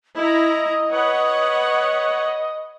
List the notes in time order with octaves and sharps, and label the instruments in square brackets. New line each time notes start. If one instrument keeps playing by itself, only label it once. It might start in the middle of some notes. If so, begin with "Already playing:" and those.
[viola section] E4 A#5 [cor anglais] D#5 [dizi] D#6
[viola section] B4 C#5 F#5